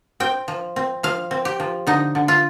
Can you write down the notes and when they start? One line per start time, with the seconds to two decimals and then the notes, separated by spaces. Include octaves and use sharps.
0.20 C4 G5
0.48 F3
0.76 C4
1.03 F3 F5
1.31 C4
1.45 G4
1.60 F3
1.87 D3 D#4
2.15 D3
2.28 F4